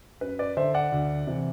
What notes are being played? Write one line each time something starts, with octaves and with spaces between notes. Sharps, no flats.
F#2 B4
B4 D5
D3 C5 E5
D5 F#5
D2
C3 E3